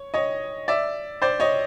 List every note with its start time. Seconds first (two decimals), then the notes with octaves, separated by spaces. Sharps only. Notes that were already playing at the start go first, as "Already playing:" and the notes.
Already playing: C#5
0.14 C#5 D#5
0.68 D5 E5
1.22 C5 D5
1.40 C#5 D#5